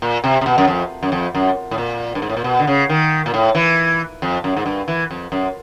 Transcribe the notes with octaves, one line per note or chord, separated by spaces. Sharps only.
A#2
C3
C3
B2
F#2
F2
F#2
F2
F#2
A2
A#2
G2
G#2
A2
A#2
B2
D3
C#3
D#3
A#2
A2
E3
F2
F#2
G#2
G2
E3
F2
F#2